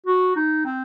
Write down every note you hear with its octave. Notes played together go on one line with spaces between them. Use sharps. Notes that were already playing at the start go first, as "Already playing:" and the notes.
F#4
D#4
C4